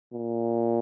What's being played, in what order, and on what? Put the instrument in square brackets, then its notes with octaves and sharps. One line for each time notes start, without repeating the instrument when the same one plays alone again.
[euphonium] A#2